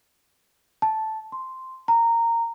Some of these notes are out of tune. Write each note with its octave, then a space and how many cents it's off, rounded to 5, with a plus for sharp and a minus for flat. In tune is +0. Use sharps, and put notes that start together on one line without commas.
A5 -5
C6 -5
A#5 -15